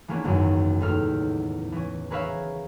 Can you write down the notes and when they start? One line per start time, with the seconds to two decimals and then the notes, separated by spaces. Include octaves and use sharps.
0.08 E3 G#3 A#3 B3 C#4 D4
0.24 G#1 C#2 F#2 D#3 F#3
0.81 E2 A2 D#4 F6
1.72 E3 C#4
2.10 G#4 A#4 B4 C#5 E5 F5